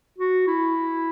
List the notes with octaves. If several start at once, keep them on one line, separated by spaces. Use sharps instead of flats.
F#4
E4